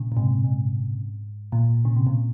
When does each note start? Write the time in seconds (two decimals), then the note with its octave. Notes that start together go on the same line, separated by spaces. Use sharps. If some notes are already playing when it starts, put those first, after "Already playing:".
Already playing: A#2 C#3
0.12 A#2
0.16 G#2 C3
0.44 G#2
1.52 A#2
1.85 C#3
1.96 C3
2.07 A#2